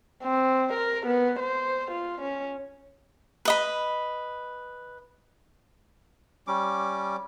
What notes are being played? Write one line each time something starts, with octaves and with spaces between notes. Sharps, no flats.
C4
A#4
B3
C5
F4
C#4
B4 D#5 B5
G3 C#4 D6